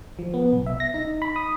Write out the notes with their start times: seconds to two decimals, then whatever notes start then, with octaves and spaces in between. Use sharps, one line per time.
0.19 F3
0.34 B3
0.53 B1
0.66 E5
0.80 A#6
0.94 D#4
1.22 B5
1.36 D#6